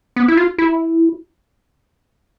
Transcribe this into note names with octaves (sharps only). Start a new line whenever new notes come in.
B3
E4
F4
E4